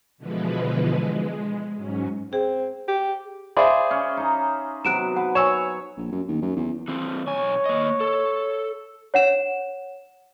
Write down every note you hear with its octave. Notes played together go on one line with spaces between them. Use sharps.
B2 D3 E3 F3 G#3 B4
G#3
G#2 F#3 C#4
C4 G#4
G4
G#4 C5 D5 E5 F5 B5
C#4
D#4 A#5
C3 F#3 B3 F#6 D7 E7
B4 F#5
C#5 G#5 E6 E7
A#1
F#2
D#2
F#2
E2
E3 C4
B1 C#5 G#5
A#3 D#5
A4
C#5 F#5 E7